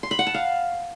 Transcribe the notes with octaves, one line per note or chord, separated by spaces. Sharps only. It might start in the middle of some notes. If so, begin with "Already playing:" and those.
C6
B5
F#5
A5
F5